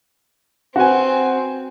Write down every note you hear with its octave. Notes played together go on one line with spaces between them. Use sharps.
C4 F#4 B4 G#5